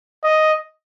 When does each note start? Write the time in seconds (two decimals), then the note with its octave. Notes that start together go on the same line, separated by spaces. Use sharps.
0.24 D#5